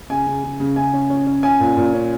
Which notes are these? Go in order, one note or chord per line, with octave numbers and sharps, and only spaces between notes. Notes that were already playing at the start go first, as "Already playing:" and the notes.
C#3 G#5
C#3
C#3
C#3
C#3 G#5
C#4
C#4
C#4
C#4 G#5
A#2
A#2
C#4